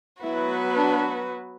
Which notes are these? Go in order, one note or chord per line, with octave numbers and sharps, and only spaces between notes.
F#3 B3 E4 F#4 B4
D4